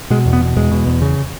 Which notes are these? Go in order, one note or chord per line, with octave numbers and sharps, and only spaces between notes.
B2 G#3
E2
B3
B2
E2 G#3
B2
E2
C#3